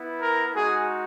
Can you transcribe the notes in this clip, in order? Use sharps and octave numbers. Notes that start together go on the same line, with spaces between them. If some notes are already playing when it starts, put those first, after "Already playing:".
Already playing: B3 E4
A#4
G#3 D#4 F#4 G#4